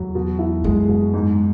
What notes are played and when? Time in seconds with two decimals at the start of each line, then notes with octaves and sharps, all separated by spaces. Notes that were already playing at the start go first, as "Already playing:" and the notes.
Already playing: E2 F#3
0.15 B2
0.39 E4
0.64 F#2 G#3
0.89 B2
1.14 G#2